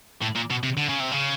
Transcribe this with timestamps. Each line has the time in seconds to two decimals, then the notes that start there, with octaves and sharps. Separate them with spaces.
0.22 A2
0.36 A#2
0.50 B2
0.63 C3
0.77 D3
0.89 C#3
1.00 C3
1.11 C#3